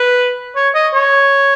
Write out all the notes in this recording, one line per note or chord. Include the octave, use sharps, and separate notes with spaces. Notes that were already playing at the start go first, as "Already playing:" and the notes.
Already playing: B4
C#5
D#5
C#5